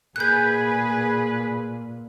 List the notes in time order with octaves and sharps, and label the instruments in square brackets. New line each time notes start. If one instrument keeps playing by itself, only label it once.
[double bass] A#2 [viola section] G#4 B4 [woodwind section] G#5 [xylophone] F#6 G6